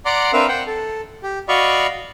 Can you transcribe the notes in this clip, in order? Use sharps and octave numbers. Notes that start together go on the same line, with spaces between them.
D5 F#5 A#5 C6 D6
C4 D4 A#4 B4 E5 F5
C5 F#5 G5
A4
G4
F#4 D5 D#5 F5 B5 C#6